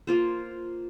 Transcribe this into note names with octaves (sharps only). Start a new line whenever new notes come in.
A#3 F4 C5